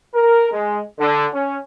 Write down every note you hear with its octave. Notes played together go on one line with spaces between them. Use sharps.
A#4
G#3
D3
C#4